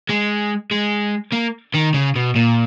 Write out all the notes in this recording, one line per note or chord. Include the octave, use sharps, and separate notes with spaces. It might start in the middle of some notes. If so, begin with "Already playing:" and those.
G#3
G#3
A#3
D#3
C#3
B2
A#2